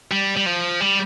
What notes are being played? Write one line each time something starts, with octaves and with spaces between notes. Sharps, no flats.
G3
G3
F3
G3